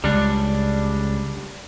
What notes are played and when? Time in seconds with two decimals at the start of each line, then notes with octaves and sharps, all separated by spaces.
0.04 C#2 G3 D4